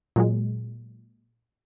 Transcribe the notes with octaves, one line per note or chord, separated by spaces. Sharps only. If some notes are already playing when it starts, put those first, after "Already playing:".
A#2 F#3 G#3